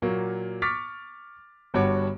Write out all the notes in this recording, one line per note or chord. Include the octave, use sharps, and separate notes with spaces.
A#2 F#3 A#3 F#4
C#6 D6 F6 A6 B6
G1 G2 F#4 C#5 D6